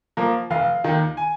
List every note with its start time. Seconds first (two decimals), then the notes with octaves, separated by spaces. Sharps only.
0.17 F3 A#3
0.50 F1 F5
0.84 D#2 D#3
1.17 G#5